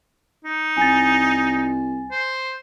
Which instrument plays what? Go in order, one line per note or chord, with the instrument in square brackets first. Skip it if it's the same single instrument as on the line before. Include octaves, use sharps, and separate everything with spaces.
[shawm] D#4
[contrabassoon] C2 [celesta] G#5 A6
[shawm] C5